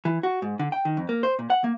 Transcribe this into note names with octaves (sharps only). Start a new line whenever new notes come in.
E3
F#4
G#2
D3
G5
D#3
F2
A#3
C5
A#2
F#5
A#3